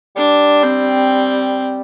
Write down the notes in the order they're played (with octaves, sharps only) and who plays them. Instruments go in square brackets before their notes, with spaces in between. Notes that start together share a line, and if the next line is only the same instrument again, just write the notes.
[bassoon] G3 [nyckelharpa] D4
[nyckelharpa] C4